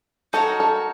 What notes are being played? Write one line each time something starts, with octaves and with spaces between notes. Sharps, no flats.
D#4 F#4 A4 A#4 C#5
A4